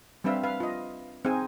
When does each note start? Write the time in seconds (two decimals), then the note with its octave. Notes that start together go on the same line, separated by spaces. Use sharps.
0.24 G3 C4 D4 B4 E5 F5
0.43 B4 F5
0.60 F4 D#5
1.25 C4 D#4 G#4 G#5